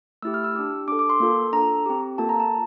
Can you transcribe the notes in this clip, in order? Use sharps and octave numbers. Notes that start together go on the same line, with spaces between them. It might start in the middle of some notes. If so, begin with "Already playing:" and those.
A3 E4 G4 E6
F6
E6
D4 G4
D4 A4 D6
D6
C6
A#3 F4 A4
D4 A4 A#5
C4 G4
A#3 F4 A4 A5
A#5
A5